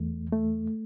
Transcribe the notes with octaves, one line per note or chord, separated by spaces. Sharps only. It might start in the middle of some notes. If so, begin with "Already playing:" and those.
Already playing: E2 A3
A3